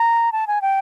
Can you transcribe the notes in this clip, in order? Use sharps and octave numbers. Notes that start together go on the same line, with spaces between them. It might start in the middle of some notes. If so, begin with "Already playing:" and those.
Already playing: A#5
A5
G#5
G5